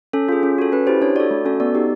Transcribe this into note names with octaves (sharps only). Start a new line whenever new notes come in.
C#4 A4
F4 G#4
C#4
F#4 A4
C#4 B4
E4 G4 C5
D4 C#5
F#4 A4 D5
A3
C#4 F#4 A4
B3 D5
D#4 G4